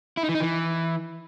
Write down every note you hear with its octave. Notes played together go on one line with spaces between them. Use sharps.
E4
D#4
E3
D#4
E3